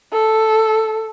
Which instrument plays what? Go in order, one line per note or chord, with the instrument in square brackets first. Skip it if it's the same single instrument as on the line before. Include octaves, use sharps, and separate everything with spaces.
[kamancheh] A4